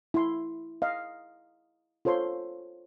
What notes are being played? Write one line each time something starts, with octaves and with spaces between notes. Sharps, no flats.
E4 C6
D#5 F5
F4 A4 C5 C#5 C6